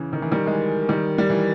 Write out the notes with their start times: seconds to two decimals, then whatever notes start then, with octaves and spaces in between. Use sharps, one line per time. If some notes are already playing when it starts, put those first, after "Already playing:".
Already playing: C#3 E3
0.13 D#3
0.22 E3
0.32 D#3 G3
0.46 E3 G#3
0.89 D#3 G3
1.18 G3
1.30 E3